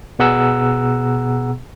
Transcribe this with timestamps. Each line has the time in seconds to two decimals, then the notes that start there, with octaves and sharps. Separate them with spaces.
0.19 B2 B3 G#4 F#5 A#5 E6